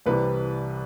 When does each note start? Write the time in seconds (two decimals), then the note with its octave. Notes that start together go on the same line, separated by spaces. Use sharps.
0.06 C2 C3 E3 G3 B4